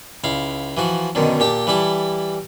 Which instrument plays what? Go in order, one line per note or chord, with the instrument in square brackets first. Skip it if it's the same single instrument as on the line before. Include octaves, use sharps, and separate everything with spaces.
[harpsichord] C#2 E4 F5
E3 F3 F#4
F#2 B2 D3 D#3
A#2 G4 G5 A5
E3 G3 E4 A4